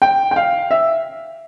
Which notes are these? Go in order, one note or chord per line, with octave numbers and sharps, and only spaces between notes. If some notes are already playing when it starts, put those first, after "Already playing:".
G5
G5
F5
E5